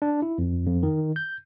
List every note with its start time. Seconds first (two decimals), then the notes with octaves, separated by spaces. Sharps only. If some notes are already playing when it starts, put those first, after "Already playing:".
0.02 D4
0.22 E4
0.38 F2
0.67 F2
0.83 D#3
1.16 G6